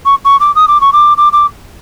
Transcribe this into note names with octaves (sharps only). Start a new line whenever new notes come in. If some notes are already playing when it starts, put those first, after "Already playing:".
C#6
C#6
D6
D#6
D6
C#6
D6
D6
D6